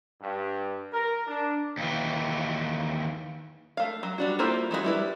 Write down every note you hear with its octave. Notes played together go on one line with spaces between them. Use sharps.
G2
A#4
D4
D#2 E3
A3 F5
F#3
G3 D4 F#4
A#3 E4 F4 A4 C5
E3 G#3 D#4 F#4
G3 E4 B4